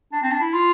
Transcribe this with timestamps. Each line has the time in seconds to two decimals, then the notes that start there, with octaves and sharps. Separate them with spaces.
0.13 D4
0.23 C4
0.32 D4
0.41 E4
0.54 F4